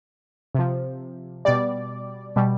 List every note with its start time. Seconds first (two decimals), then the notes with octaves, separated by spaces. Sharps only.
0.55 C3 F3
1.45 B2 G3 D5
2.36 B2 G3